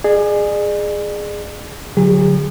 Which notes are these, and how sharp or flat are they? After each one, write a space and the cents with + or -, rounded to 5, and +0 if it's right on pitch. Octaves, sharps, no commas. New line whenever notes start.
G#4 +0 D5 +40
D3 +0 F#3 +0 G#4 -45